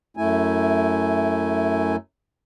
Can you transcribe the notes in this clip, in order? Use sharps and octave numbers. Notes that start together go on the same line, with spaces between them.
F#2 A3 E4 G#5